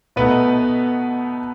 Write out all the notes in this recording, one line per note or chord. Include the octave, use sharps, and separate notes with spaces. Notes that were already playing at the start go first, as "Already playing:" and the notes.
B2 A3 B3 D#4 B4